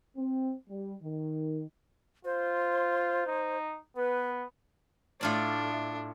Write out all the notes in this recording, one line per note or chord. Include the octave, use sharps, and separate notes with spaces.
C4
G3
D#3
F4 C5
D#4
B3 B4
A2 D4 F4 D5